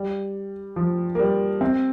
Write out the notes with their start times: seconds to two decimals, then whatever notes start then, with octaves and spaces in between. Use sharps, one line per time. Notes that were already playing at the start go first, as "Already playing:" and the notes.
Already playing: G3
0.76 F3
1.15 A#3
1.19 G3
1.61 C4